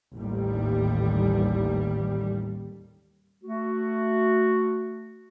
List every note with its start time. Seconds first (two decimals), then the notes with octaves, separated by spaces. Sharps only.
0.14 A1 D#2 G3
3.43 A3 F#4